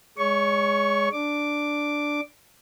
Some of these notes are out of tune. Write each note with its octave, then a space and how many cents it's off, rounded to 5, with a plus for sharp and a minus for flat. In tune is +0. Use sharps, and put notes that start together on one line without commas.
G#3 -5 C#5 +25 C#6 -5
D4 +0 D6 +0